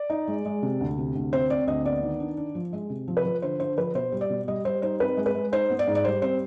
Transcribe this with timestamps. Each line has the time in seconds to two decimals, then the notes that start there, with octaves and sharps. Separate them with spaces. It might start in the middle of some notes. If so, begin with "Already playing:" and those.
Already playing: D5
0.10 D#4
0.28 G#3
0.45 G#3
0.62 C3
0.80 D2
0.98 C3
1.15 D2
1.33 C4 C5
1.50 C4 D5
1.67 D2 D#5
1.85 B3 D5
2.03 D#3
2.20 D4
2.37 D4
2.55 F3
2.73 G#3
2.90 C3
3.08 F3
3.17 B4
3.25 F3
3.42 D3 C5
3.60 D3 C5
3.77 F3 B4
3.95 B2 C5
4.12 G3
4.21 D5
4.30 B2
4.48 G3 D#5
4.65 G3 C5
4.82 D#4 C5
5.00 C4 B4
5.17 G#3
5.26 B4
5.35 G#3
5.52 D#4 C5
5.70 B3
5.79 D5
5.87 G#2
5.95 D5
6.05 G3 C5
6.22 C4 C5